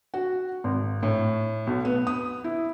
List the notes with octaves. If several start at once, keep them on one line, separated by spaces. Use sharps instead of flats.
F#4
G#1
A2
B1
B3
D#6
E4